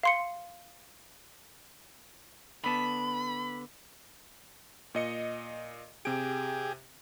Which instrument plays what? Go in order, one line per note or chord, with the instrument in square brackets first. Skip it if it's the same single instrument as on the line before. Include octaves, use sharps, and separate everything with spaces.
[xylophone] F5 C6 C#7
[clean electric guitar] D3 B3 A5 [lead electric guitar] B5
[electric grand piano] A#2 D#5 C#7
[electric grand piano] C3 D7 [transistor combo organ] G4 G#4